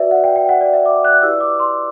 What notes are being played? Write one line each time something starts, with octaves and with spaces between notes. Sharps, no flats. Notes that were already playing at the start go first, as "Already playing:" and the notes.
Already playing: F#4 B4 D5 E5
F#5
G5
G5
F#5
D5
E5
D6
F#6
E4 G4 B4 D5 E6
D6
C6